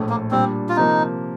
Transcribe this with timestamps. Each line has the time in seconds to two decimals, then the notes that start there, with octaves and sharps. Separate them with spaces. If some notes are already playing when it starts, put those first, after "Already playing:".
Already playing: A#1 A2 A3
0.09 A#3
0.31 A#2 G3 C4 D4
0.69 F4
0.76 C3 F3 A#3 D#4